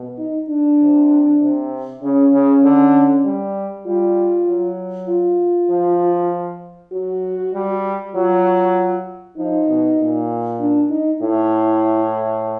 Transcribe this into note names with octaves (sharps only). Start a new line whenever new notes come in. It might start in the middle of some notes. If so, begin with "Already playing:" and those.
Already playing: B2
D#4
D4
C3
C3
C#3 C#4
C#3
D3
G3
G3 F4
F#3
F4
F3
F#3 F#4
G3
F#3 F4
F3 D#4
B2
A#2
D4
D#4
A2 E4